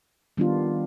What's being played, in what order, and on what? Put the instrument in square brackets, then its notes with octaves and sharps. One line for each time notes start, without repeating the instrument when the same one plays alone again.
[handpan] D#3 G3 B3 D4 F4